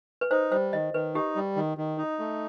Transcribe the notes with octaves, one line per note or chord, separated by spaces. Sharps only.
B4
D#4 C5
G3 C5
D#3 D#5
D#3 B4
D#4 G4
G3
D#3
D#3
D#4
A3